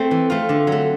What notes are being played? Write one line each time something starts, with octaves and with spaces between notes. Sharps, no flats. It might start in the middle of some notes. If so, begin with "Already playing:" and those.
Already playing: A3 C4
E3
A3 C4 F4
D3
F#3 A3